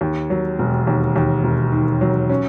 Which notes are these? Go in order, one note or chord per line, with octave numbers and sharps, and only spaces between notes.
D#2
F#3
E1
D#2
D#2
E1
D#3
F#3
C#4